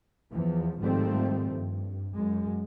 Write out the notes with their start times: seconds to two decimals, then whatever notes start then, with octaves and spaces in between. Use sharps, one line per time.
0.32 E2 E3 F3
0.80 G#2 D#3 F3 G3 A3 C4
1.52 G2
2.16 F#2 G#3